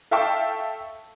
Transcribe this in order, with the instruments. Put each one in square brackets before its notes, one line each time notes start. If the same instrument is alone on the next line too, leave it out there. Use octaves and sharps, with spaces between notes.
[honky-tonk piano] A4 E5 F5 G5 A5 C#6